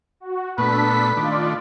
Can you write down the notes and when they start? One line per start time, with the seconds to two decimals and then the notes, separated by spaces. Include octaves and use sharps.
0.20 F#4
0.58 A#2 A3 B3 D4 A4 B4 B6
1.17 D#3 A3 D4 F4 D5